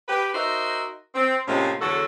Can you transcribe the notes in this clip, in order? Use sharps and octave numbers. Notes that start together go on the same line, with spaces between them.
G4 B4
D#4 F#4 A#4 C5 D#5 E5
C4
A2 C3 F3 G#3 A#3 C#4
E2 D3 F#3 F#4 A4